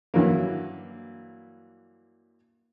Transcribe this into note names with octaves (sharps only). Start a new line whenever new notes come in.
G2 E3 F#3 A#3